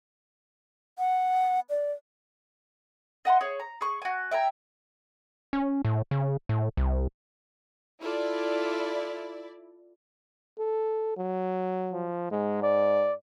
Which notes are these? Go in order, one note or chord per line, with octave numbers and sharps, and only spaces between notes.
F#5
D5
D#5 F#5 A5 C6
G#4 C#5
A#5
G#4 C#6
F#4 G#5
E5 G5 G#5 A#5
C#4
A2
C#3
A2
C2
E4 F4 A4 D5
A4
F#3
F3
G#2 G#3
D5